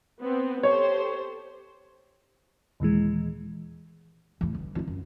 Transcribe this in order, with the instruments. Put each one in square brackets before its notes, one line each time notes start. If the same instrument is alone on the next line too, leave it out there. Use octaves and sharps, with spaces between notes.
[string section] B3 C4
[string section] G4 A4 C5 [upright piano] C#5
[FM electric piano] D#2 A#2 E3 G#3
[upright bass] E2 A2
G1
A#2 E4
F#2